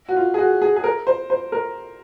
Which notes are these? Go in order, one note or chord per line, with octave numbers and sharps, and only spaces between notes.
F#4
F4
G#4
F#4
G#4
G#4
A#4
C5
C5
A#4